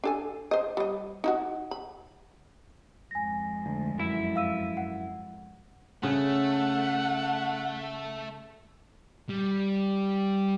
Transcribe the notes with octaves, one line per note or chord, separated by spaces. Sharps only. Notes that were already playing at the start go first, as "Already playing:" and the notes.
D4 A4 G#5
C5 D#5
G3 D#5
D#4 E4 F#4
B5
F2 G#2 G#5 A#6
D2
F#2 E4 E5
F5 E6 D#7
F#5
C#3 A3 F#5
G3